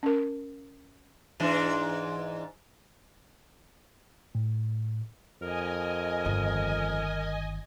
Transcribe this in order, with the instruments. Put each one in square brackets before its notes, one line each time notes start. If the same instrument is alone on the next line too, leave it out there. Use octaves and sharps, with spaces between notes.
[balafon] C#4 A#4
[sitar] G#2 E3 D4
[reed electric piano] A2
[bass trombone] F2 [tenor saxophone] A#4 [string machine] D#5 G#5
[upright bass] G1 D#3